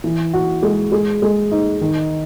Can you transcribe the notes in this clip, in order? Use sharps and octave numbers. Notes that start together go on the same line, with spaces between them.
E3
F#4
G#3
G#3
G#3
D#4
D#3